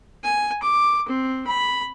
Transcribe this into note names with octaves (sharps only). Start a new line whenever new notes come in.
G#5
D6
C4
B5